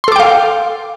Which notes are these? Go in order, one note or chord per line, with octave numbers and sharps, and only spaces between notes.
A4 F5 G5 C6 D6